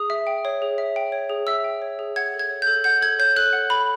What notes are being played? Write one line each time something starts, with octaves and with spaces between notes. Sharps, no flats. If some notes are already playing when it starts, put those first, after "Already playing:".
Already playing: G#4 D#6
E5
G5
C#5
G#4
E5
G5
C#5
G#4
E5 E6
G5
C#5
G#4
F#5 G#6
A4
G#6
C#5
A4 G6
F#5 G6
A4 G#6
C#5 G6
A4 F#6
F#5
A4 B5